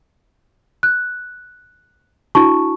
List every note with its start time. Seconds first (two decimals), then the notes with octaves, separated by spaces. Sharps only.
0.83 F#6
2.35 D4 E4 F#4 A5 C#6